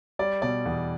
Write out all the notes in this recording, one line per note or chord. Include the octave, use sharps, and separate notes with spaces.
G3 D5
B2 D5
E2